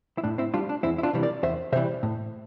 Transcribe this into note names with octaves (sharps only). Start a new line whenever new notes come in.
E4
A2 D4
C4 E4
G3 D4 F4
D4
E2 C4 E4
E4
D4 F4
C3 E3 G3
A#4 D5
E2 C5 E5
C3 E3 G3 C5 E5
A2